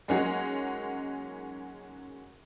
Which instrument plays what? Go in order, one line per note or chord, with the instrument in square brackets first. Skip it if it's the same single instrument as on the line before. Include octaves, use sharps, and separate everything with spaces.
[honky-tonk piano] F#3 G#3 A#3 C#4 D#4 F#4